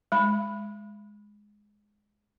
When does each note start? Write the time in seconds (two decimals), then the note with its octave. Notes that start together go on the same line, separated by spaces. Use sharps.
0.12 G#3 B5